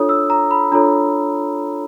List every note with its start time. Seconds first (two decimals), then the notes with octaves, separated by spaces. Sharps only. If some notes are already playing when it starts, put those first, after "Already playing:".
Already playing: D4 F4 A4 C#5 D#6
0.09 E6
0.30 A#5
0.51 B5
0.72 D4 F4 A4 C#5 A#5